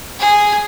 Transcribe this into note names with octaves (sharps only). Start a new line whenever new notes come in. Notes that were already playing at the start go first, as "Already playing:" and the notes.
G#4